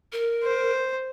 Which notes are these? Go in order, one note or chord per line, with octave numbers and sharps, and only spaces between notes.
A#4
C5